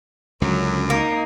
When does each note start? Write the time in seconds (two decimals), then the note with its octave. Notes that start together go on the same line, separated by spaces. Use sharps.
0.42 C#2 F#2 D3 F#3
0.90 A#3 D#4